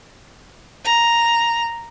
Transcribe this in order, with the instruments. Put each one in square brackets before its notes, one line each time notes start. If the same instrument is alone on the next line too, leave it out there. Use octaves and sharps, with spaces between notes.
[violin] A#5